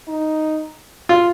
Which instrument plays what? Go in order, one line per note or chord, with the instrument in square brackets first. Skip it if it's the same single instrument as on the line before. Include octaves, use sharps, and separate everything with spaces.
[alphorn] D#4
[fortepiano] F4